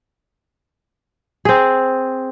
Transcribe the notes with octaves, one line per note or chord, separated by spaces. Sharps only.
C4 G#4